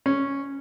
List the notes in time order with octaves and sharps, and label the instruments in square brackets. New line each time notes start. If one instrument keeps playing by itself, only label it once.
[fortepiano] C#4